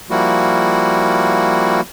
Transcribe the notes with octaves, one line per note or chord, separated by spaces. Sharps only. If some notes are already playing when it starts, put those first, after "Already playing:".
F3 G3 A#3 E4 F#4